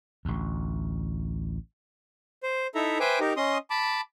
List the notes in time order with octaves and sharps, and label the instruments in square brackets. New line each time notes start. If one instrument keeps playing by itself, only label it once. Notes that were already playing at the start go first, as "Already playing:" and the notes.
[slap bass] A1 D2
[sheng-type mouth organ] C5
D#4 E4 A4 E5 A#5
B4 C5 E5 G5 G#5 D6
D#4 G4 A#4
C#4 D#5 C6 D#6
A5 B5 D6